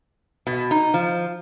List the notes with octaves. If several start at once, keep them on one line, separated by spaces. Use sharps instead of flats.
B2
D#4
F3